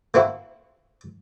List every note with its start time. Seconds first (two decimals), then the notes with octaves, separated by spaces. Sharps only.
0.14 A#3 C4 E4 F#4